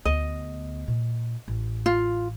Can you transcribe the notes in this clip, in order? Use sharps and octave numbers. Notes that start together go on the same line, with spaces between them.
D2 B3 D#5
A#2
A1
F4